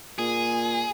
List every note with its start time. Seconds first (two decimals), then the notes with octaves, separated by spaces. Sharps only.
0.19 A#2 G#4